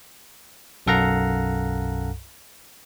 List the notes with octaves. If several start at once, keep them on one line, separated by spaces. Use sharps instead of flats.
B1 F#2 A4 F5 F#5 A#5